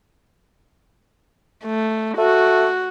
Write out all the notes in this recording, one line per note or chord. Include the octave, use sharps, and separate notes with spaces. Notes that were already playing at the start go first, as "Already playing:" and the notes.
A3
A3 F#4